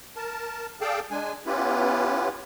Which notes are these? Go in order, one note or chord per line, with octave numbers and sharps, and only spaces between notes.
A#4 A5
G#4 A4 D5 F5 G5 A5
G#3 D4 G#5
B3 C#4 E4 F4 G4 B4